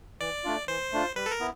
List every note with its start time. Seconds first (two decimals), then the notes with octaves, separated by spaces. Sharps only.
0.20 E3 D5
0.44 A3 D4 F4
0.68 E3 C5
0.92 A3 D4 F4
1.16 G3 B4
1.26 A4
1.32 A#4
1.40 B3 E4